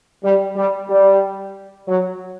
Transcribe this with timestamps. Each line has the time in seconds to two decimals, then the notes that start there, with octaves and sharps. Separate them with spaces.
0.23 G3
0.56 G3
0.89 G3
1.88 F#3